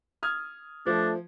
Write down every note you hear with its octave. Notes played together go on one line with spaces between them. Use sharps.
D#6 F6 G#6
F3 A3 D4